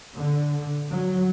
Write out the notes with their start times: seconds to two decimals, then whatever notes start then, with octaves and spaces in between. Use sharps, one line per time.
0.16 D3
0.89 F#3